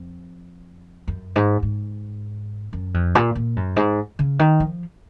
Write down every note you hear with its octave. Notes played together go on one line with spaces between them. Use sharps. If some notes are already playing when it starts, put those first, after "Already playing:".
Already playing: F2
F#2
G#2
G#2
F#2
F2
A#2
A#2
F#2
G#2
C#3
D#3
F3